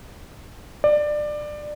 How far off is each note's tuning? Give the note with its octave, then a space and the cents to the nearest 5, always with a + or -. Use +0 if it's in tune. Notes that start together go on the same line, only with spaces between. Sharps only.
D5 +20